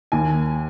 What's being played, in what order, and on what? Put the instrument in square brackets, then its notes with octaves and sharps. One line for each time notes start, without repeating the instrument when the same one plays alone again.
[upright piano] D#2 G#5